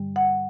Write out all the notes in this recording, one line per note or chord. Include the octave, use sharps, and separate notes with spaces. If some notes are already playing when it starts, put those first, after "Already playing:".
Already playing: G2 D3 G3
F#5